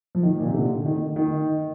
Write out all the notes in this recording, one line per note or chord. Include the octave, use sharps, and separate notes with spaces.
F3
D#3
A#2
C3
D3
D#3
D#3